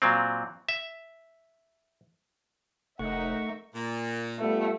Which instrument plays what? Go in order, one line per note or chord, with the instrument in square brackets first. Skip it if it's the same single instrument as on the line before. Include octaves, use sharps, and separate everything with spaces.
[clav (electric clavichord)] A#2 F#3 C4
E5
[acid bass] F1 [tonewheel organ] A3 C#6 [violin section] D#4 A#4 E5 [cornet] F#5
[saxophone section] A#2
[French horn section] G3 B3 F4 [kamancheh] A3